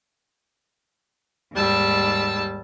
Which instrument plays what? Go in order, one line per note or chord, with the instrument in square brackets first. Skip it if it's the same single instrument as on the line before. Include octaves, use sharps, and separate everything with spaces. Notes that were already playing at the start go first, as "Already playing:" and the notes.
[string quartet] D#2 G#2 G3 A5 E6